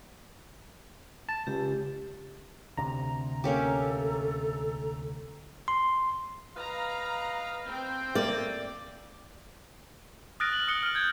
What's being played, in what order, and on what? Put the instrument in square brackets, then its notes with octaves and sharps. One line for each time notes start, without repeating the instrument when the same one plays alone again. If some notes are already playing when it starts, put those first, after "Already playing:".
[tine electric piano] A5
[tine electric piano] C#2 [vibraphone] G4
[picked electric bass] D2 C3 [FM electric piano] A#5
[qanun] A#3 C#4 G4 [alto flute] A4
[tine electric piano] C6
[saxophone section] B4 D#5 F5 [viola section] A#5
[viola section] C4 G5
[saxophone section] A3 A#3 [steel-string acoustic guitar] D5
[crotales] D#6 F6 F#6 A6 A#6 D7
F#7
D#6 F#6 C#7 F#7 G7
F6 D7
G6 G#6